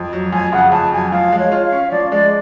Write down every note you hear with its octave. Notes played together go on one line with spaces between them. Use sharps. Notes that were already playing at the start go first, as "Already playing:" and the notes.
Already playing: F2
F#3
F2 G#5
C#3 F#5
F2 A5
F#3 G#5
F3 F5
G#3
C#5
F4
F5
C#4
F3 D5
G#3 D5